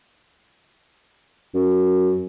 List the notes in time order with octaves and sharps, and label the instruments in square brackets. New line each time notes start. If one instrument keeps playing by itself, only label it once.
[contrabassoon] F#2